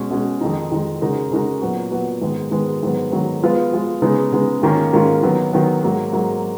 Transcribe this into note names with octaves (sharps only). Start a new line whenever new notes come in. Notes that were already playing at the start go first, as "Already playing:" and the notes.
Already playing: B2 G#3 C#4
B2 G#3 C#4 G#4
F2 D#3 G#3 D#4
F2 D#3 G#3 D#4
C#3 G#3 D#4 F#4 A#4
C#3 G#3 D#4 F#4 A#4
A#2 F#3 B3 F#4
A#2 F#3 B3 F#4
G#2 D#3 G#3 B3
G#2 D#3 G#3 B3
G#2 D#3 F#3 B3
G#2 D#3 F#3 B3
F3 G#3 B3 F4
F3 G#3 B3 F4
C#3 G#3 B3 D#4
C#3 G#3 B3 D#4
G#2 D#3 A#3 C#4 F4
G#2 D#3 A#3 C#4 F4
D#3 F#3 B3
D#3 F#3 B3
G#2 F#3 A#3
G#2 F#3 A#3